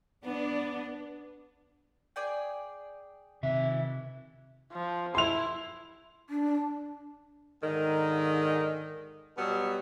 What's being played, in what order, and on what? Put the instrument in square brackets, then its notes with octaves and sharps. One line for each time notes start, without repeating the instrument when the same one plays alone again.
[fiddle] B3 [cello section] D4
[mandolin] G#4 D5 G5
[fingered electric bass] C3 [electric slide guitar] D#3 E5
[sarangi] F3
[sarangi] E4 [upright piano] C6 F7
[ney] D4
[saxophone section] G#2 D3 D#3
B2 F#3 G3 B3